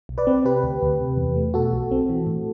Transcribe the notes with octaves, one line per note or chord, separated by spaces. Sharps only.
B1
B4 D5
C4
C3 G4 B4
D2
D2
C3
E2
A3
B2 F#4 A4
B1
C4
E3
A2